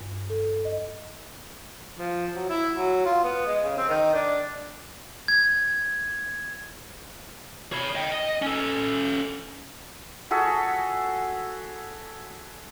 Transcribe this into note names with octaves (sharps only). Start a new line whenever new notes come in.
G2
A4
D#5
F3
F#3
E4
F#3
F4
B3
G#3
C#3
C4
D#3
D4
G#6
C#5 B5
D#5 G5
D#5
C#4 A4
F#4 G#4 A4 E5